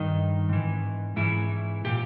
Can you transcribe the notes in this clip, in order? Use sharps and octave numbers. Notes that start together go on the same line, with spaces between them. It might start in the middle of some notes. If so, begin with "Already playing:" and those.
Already playing: G2 D#3 D#4
G#2 E3
G#2 E3 E4
A#2 G4